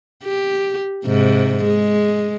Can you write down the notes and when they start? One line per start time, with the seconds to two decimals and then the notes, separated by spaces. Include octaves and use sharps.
0.24 G4
1.06 G#2 C3
1.64 G#3